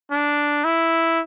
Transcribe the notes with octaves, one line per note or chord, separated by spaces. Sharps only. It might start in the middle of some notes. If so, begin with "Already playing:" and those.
D4
E4